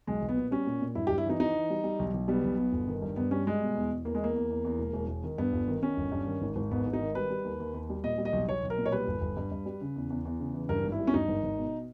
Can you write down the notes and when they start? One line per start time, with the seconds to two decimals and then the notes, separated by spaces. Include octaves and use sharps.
0.07 B1 G#3
0.22 B1
0.29 B3
0.36 A#2
0.51 G3 C#4
0.66 A#2
0.81 A#2
0.95 G2 E4
1.07 G4
1.10 G2
1.18 E4
1.25 E3 D#4
1.40 E3 D#4
1.54 E3
1.70 G3
1.84 G3
1.99 B1
2.14 B1
2.28 G3 B3
2.43 B1
2.58 B2
2.73 G1
2.88 D#3
3.02 G2
3.16 G2 B3
3.31 G3 C#4
3.46 G3 G#3
3.61 B2
3.76 E2
3.91 E2
4.05 E2 A#3
4.15 G#3
4.20 E2 A#3
4.35 E2
4.50 E2
4.65 E2
4.79 E1
4.93 E1
5.08 E1
5.24 D#3
5.38 G2 B3
5.53 G1
5.68 D#3
5.82 D#3 C#4
5.97 G1
6.12 G2
6.27 D#3
6.41 G#1
6.56 G#1
6.71 G#2 B3
6.86 G#1
6.93 D#4
7.01 D#3
7.15 G3 B4
7.30 G3
7.45 D#2
7.60 D#2
7.74 D#2
7.89 G3
8.03 A#2 D#5
8.18 G3
8.25 D#5
8.33 B1
8.47 B1 C#5
8.63 B1
8.70 A#4
8.78 A#2
8.86 C#5
8.92 G3 B4
9.08 G1
9.21 G1
9.37 G2
9.52 G2
9.66 G3
9.81 C#3
9.96 E2
10.10 E2
10.25 E2
10.40 C#3
10.54 E3
10.69 G2 A#4
10.84 G#1
10.92 E4
10.99 G3
11.07 C#4
11.14 G2 D#4
11.28 G#1
11.44 G#1
11.57 B2